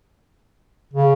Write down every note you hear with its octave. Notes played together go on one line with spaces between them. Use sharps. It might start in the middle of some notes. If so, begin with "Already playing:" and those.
C#3